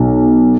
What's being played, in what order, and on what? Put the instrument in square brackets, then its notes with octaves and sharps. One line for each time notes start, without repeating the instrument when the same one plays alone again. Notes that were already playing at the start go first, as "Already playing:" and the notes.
Already playing: [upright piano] B1